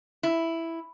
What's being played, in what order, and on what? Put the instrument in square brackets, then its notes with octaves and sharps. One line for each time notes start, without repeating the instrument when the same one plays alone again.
[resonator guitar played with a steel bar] E4